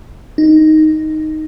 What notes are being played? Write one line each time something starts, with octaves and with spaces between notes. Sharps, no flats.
D#4